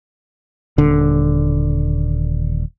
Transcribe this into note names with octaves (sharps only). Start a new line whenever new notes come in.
D#1 D3